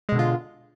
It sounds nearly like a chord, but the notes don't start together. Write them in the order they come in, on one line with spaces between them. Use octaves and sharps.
G#3 B2 D3 F4